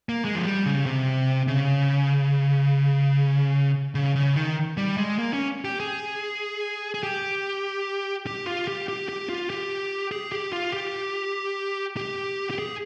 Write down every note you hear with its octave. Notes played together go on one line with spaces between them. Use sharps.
A#3
G#3
F3
G3
C#3
C3
C#3
C#3
C#3
D#3
G3
G#3
A#3
C#4
G4
G#4
G#4
G4
G4
F4
G4
G4
G4
F4
G4
G#4
G4
F4
G4
G4
G4
G#4